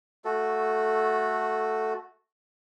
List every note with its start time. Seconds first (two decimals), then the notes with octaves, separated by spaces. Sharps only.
0.25 A3 F#4 A4